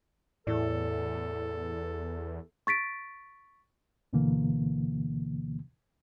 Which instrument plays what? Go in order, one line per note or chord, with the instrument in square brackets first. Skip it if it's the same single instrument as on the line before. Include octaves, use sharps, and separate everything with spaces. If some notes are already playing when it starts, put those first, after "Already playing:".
[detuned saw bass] E2 [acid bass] A2 [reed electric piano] E4 D5 [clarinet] A4
[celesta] C#6 A6 B6 D7
[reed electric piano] D2 B2 D3 E3 A#3